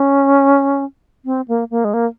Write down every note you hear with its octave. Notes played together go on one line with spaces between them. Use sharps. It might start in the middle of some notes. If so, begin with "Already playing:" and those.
Already playing: C#4
C4
A#3
A#3
G#3
A#3